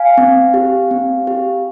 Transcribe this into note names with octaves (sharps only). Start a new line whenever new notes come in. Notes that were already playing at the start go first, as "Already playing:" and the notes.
Already playing: F5 G#5
C4
G4
C4
G4